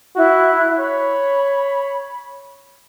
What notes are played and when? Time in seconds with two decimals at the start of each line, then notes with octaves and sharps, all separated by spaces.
0.15 E4 F#4 F#6
0.79 C#5 B5